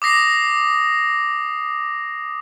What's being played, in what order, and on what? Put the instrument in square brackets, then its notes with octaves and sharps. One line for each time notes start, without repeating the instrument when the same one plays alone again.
[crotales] D6 D#6 A#6 C7